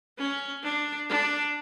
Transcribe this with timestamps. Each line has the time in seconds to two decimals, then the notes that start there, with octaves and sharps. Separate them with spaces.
0.18 C#4
0.63 D4
1.10 D4